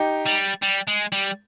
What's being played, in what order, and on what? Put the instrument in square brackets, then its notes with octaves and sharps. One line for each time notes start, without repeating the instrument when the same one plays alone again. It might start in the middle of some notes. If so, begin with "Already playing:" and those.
Already playing: [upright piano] D#4 G4
[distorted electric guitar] G3
G3
G#3
G3